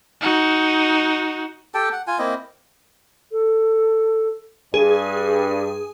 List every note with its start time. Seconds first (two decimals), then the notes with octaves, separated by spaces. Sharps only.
0.21 D#4 F#4
1.74 G4 A4 G5 A5
1.93 F#5
2.07 F4 G#5
2.19 A#3 C4 E4 D#5
3.32 A4
4.74 G2 G#4